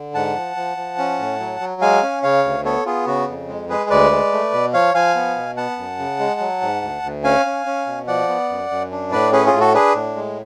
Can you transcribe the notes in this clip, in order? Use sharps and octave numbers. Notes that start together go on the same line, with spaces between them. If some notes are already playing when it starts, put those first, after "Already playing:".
Already playing: D3
G#2 F#5 A5
F3
F3
F3
C#4
A2
F#3
F#3
G#3 F5 G#5
C#4
C#3 C#5 F5
D2
B3 A4 C#5
B3 F4 G#4
C#3 F#4
F2
G#3
G#3 G#4 B4
D2 B4 D5
G#3
A3
B2
F3 C#5 F5
F3 F5 G#5
B3
B2
B3 F#5 A5
F#2
C#3
G#3
F#3
G#2
D2
D2
C#4 F5 G#5
C#4
C#4
B2
F3 D5 F#5
B3
F#2
F#2
D4
A2 B4 D5
C#4 G#4 B4
F4 G#4
A2
F#4 A4
D4 G#4 B4
A2
G#3